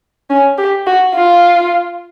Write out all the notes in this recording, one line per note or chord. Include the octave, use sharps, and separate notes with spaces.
C#4
G4
F#4
F4